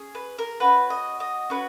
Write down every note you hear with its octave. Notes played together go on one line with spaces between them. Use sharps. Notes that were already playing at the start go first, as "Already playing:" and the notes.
Already playing: C#4 G#4
B4
A#4
C#4 F#4 B4
D#5
D#5
C#4 F#4 B4